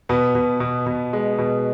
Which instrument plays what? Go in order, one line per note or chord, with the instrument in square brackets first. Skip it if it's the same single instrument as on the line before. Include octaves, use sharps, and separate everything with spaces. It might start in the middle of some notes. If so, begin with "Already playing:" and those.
[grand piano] B2 B3
B2
B2
B2
G#3
B2